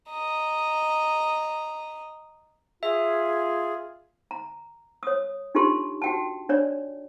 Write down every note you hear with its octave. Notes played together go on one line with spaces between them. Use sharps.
D#5 A#5
F4 G#4 E5
A#5
C#5 D#6
D4 D#4 F4 G4 A4 C6
F#4 G5 A5
D4 C#5 D5